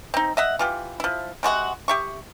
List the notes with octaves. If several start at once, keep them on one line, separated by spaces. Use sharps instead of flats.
C4 D#4
D#5 E5 F#5
E3 F4 G4
F3 E4
C3 G#3 F#4 F#5
G4 E5 C#6